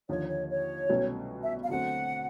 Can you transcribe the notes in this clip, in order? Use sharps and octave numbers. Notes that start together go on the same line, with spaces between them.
D#2 D3 F3 C#5
C#5
C#5
C2 B2 F#3 A3 C#4
E5
F5
D3 F#3 A3 C4 F#5